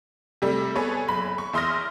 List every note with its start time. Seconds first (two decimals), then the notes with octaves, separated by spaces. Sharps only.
0.42 C3 G3 A3
0.75 B3 G#4 A4 B4 C#5
1.08 F#1 B5
1.38 C#6
1.53 E2 E5 C6 D#6 F6 A#6